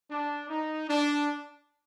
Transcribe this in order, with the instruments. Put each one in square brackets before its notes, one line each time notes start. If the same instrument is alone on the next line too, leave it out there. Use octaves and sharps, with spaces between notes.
[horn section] D4
D#4
D4